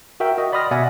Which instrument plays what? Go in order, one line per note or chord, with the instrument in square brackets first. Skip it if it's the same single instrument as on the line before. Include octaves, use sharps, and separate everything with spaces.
[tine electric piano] F#4 A#4 E5 G5
F#4 D#5
D5 B5 C6 D#6 F6 A#6
B2 D5 E5 F#5 G#5